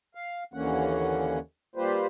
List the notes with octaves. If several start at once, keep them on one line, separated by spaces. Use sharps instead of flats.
F5
D#2 D3 E3 A#3 C#4 F#5
G3 A#3 F4 G4 B4 C5